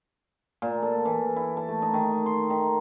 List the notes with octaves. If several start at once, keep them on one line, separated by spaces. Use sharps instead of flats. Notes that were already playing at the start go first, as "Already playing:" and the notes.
A#2
A4
E3
E4
A5
A3
D#4
D#3
C6
D#3